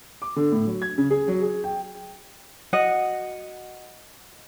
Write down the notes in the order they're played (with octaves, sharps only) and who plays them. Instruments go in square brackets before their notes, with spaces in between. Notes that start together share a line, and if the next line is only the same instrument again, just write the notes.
[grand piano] D6
D3
A2
F#3
G#6
C#3
G#4
F#3
G#4
G5
[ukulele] F#4 D#5 F#5